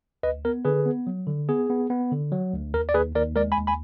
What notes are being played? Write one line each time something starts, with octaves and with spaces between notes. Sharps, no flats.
D2 B4 D#5
B3 A#4
D3 G#4 B4
B3
F#3
D3
B3 G#4
B3
B3
D3
F#3
D2
D#2 A#4
D5
D#2 G#4 B4
D#2 A#4 D5
G#3 A#4 D5
G#5 B5
D#2
G#5 B5